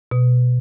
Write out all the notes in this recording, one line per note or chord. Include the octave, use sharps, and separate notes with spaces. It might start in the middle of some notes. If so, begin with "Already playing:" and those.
B2